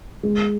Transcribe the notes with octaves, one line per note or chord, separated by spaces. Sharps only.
G#3